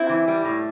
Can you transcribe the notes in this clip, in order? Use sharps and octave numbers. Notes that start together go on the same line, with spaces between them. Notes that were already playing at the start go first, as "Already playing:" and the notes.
Already playing: C4 E4
E3
G3
A2